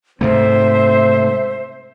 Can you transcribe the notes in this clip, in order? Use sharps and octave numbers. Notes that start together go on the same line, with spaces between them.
G#2 C3 A3 C4 C5 E5